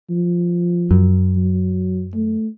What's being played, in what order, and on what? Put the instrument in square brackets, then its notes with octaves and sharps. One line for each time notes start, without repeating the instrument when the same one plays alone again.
[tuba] F3
[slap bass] F#2
[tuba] F#3
A3